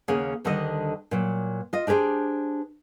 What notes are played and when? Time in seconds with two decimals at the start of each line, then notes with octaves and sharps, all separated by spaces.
0.08 D#2 C#3 A#3 C#4 G#4 F#5
0.44 D2 D3 D#3 G3 A4 D#5
1.11 A#2 F#3
1.73 F4 D#5
1.87 D4 G4 G#4 B4 C5